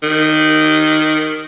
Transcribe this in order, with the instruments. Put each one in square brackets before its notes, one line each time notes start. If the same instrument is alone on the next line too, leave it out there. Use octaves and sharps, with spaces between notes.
[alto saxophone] D#3